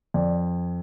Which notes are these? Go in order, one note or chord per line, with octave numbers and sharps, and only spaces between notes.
F2 D5